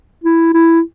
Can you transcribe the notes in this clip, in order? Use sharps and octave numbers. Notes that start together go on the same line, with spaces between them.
E4
E4